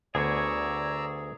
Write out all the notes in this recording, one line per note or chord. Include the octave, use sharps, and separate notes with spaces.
D2 B3 G#4 C#5 D5 A#5 E6